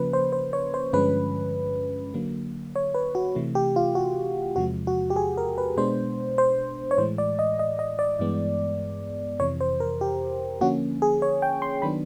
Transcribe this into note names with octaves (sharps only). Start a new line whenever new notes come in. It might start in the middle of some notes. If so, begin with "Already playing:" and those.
Already playing: C#3 F3 A#3 C#4 B4
C5
C5
C#5
C5
G2 D3 F3 G#3 C#4 B4
D3 F#3 A#3
C#5
B4
F#4
C3 E3 A3
G4
F4
F#4
E2 C3 F3 G#3 F#4
F#4
G4
G#4
A#4
B4
B2 G#3 B3 D4 C5
C5
C#5
A2 E3 G#3 C5
D5
D#5
D#5
D#5
D5
G2 E3 G#3 B3
F2 C3 E3 C#5
C5
A#4
G4
D3 F3 A#3 C#4 F#4
G#4
C#5
G5
C6
D#3 F#3 B3 D4 B5